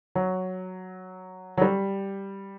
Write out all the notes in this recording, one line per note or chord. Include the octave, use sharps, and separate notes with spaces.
F#3
F#3
G3